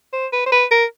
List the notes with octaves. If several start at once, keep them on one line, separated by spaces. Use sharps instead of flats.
C5
B4
C5
B4
A#4